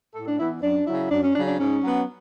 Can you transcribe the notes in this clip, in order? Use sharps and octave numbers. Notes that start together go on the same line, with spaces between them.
A2 A4
D4
E3 B3 E4
F#2 D4
C#3 F#3 E4
F#2 D4
C#4
C#3 F#3 D4
D4
G#2 C#4
F#3 B3